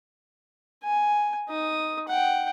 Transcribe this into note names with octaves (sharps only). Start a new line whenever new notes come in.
G#5
D#4 D#6
F#5 G5